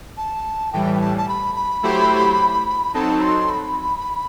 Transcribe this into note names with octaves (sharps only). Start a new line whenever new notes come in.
A5
A2 E3 G3 G5
G5
A5
A5
B5
B5
F#3 A3 E4 G4 C5
F#3 C4 D#4 A4 A5
C6
B5